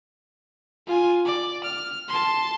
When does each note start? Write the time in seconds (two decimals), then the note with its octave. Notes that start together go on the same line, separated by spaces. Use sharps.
0.87 F4 G#5
1.25 D5
1.64 F6
2.08 A5 C6